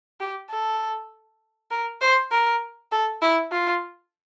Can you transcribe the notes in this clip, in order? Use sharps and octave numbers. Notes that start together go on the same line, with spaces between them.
G4
A4
A#4
C5
A#4
A4
E4
F4